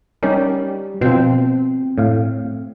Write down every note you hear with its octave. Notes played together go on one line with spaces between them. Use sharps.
G3 C#4 D#4 A#4
B2 F3 C4
A2 F5